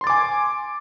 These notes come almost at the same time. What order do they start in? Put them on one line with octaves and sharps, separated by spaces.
C6 A6 D6 G#5